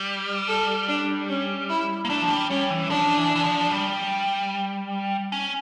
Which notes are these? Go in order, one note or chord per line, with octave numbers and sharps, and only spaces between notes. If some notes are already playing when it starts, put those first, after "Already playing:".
Already playing: G3
A4
D4
C#4
E4
A#3
A3 D4
F3
G3
G3 C#4
E3
F3 D4
E3
E3
F3
G3
C#4